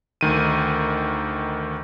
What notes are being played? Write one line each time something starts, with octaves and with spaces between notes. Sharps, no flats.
D2 D#3 D#7